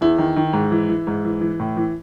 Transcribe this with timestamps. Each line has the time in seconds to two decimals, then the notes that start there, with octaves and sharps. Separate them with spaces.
0.01 E2 E4
0.18 D#3
0.36 D#3
0.53 G#2
0.71 E3
0.89 E3
1.07 G#2
1.24 E3
1.41 E3
1.59 A2
1.77 E3